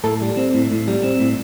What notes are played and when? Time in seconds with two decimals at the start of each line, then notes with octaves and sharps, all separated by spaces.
0.04 A2 A4
0.21 G3
0.37 C4
0.54 A2
0.71 A2
0.88 G3
1.04 C4
1.20 A2